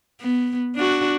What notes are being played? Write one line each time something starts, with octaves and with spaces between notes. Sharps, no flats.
B3
D4 F#4